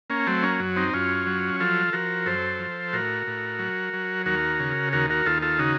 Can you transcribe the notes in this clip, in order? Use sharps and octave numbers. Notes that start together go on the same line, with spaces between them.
A#3 C#4
F#3 A3 C4
A#3 C#4
F#2
C4 D#4
F#2 C#4 F4
F#3
F3 F4 A4
F3 F#4 A#4
F#2 A4 C5
F3
A2 F#4 A#4
A2
F#3
F#3
D#2 F#4 A#4
C#3
D#2 F#4 A#4
F#4 A#4
D#2 F4 A4
F4 A4
C#3 D#4 F#4